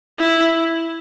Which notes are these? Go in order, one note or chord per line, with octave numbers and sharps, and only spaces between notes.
E4